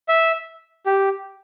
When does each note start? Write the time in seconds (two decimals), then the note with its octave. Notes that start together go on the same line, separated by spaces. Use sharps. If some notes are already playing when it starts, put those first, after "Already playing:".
0.09 E5
0.86 G4